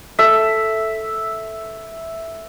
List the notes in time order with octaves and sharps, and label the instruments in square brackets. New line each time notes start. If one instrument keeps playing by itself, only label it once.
[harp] A4 [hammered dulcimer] E5